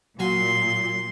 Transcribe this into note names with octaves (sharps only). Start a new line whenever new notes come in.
A#2 F#3 F#4 F5 G#5 C6